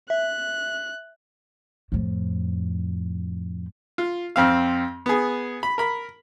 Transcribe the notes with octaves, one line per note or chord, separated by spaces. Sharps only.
E5 F#6
F2 A2
F4
F2 C4 F5
B3 G#4
B5
A#4 B5